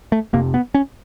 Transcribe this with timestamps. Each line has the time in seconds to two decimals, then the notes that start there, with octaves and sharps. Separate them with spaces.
0.12 A3
0.33 F1 F2 C3 A#3
0.54 B3
0.74 C#4